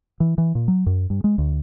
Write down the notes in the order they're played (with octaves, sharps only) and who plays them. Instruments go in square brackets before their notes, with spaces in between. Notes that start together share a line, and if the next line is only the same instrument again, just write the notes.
[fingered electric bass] E3
E3
A#2
F#3
F#2
G2
G#3
D2